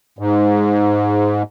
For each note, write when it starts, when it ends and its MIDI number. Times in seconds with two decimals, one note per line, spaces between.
0.19 1.43 44